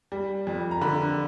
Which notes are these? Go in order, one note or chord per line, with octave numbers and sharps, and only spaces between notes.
G3
F2
A#5
D3 B5